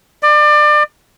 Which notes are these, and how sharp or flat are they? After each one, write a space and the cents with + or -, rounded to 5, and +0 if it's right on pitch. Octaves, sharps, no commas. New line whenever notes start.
D5 +30